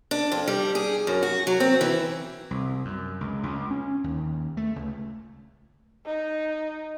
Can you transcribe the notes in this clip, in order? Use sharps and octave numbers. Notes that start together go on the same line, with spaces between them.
D4
F2
G3
G#4
F#2
F#4
F#3
C4
E3
C2
F#2
C#2
C#2
C#4
D#2
A3
C#2
D#4